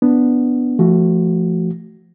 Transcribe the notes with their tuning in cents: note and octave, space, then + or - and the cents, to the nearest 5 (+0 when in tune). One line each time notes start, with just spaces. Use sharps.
B3 +0 D4 +0
F3 -25 A3 +0 F#4 +15